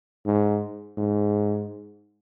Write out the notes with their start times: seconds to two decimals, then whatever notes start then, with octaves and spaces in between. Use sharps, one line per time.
0.26 G#2
0.98 G#2